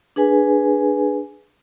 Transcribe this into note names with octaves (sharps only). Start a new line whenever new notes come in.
D4 G#4 B4 G#5